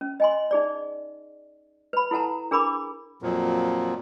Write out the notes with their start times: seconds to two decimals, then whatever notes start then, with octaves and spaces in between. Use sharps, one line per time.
0.01 C#4
0.20 D#5 G#5 C6
0.51 D#4 G#4 D5
1.93 B4 B5
2.11 E4 A4 F#5 A5 A#5
2.51 D4 G#4 A#4 B5 D6
3.22 F2 A#2 F3 F#3